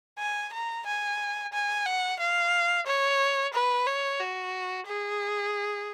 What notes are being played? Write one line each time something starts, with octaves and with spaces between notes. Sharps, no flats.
G#5
A#5
G#5
G#5
F#5
F5
C#5
B4
C#5
F#4
G#4